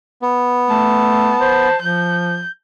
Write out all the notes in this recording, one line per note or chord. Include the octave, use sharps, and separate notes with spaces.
B3
A3 A5
C5
F3 G6